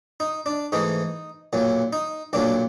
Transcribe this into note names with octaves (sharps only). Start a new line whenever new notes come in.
D#4
D4
G#2 E3 A3 D#4
B1 A#2 F#3
D#4
B1 A#2 F#3 D4